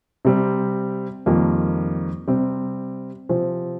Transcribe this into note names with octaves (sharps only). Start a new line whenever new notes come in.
C3 G3 C4
F2 D#3 G3 A#3 F4
C3 G3 C4
C3 F3 C4